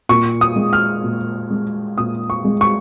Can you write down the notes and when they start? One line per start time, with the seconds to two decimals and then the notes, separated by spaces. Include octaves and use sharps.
0.09 A#2 C#6
0.41 D#6
0.56 G#3
0.73 F6
1.04 A#2
1.50 G#3
1.98 A#2 D#6
2.30 C#6
2.45 G#3
2.61 C#6